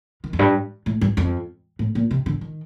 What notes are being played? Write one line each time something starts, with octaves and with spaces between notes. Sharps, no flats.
D#3
F2
G2
A2
G2
F2
A2
A#2
C3
D3
D#3